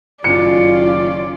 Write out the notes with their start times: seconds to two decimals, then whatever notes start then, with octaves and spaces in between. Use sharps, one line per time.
0.24 F#1 D#3 C#4 F4 D5 C#7